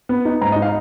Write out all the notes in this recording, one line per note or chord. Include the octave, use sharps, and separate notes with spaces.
B3
D#4
G#2 A#5
D#5
D#4
F5